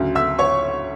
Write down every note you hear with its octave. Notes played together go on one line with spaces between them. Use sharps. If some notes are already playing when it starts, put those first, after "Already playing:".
Already playing: D2 C#3 F#3
E5 E6
C#5 C#6